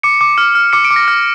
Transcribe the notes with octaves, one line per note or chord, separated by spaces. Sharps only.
D6 C#7
D6
F6
F6
D6 C#7
D7
D6
A#6
F6